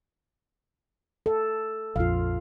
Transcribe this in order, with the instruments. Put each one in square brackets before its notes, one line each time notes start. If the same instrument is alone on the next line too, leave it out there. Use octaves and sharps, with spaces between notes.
[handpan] A4
[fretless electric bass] A#1 F2 [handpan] F4 F5